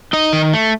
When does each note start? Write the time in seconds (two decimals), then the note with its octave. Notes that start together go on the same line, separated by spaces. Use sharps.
0.13 D#4 D#5
0.33 D#3
0.53 A3